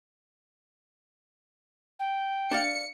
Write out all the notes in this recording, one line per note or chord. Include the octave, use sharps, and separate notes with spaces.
G5
D4 D5 F5 C#7